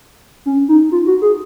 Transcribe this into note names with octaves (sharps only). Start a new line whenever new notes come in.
C#4
D#4
F4
F#4
G#4